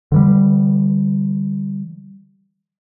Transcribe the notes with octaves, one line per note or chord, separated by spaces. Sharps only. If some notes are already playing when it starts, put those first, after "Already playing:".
D3 E3 G3